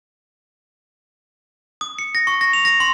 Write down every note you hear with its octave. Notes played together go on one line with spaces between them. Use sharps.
D#6
C#7
A#6
C#6
A#6
F7
A#6
C6